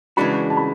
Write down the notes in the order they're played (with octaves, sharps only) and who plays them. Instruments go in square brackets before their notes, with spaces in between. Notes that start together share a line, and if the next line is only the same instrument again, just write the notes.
[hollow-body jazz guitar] C#3 E3 G#3 D4 F#4 [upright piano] B5
[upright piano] A5
B5